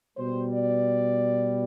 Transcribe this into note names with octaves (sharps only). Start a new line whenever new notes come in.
B2 G3 C5
D5